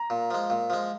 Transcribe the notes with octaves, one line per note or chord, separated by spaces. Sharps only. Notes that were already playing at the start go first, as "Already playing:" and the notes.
Already playing: A#5
A#2
F3 G#3
A#2
F3 G#3